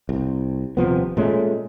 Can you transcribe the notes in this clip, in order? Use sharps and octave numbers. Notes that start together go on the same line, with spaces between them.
C2
D#1 C3 F3 B3
A#2 G#3 A3 C#4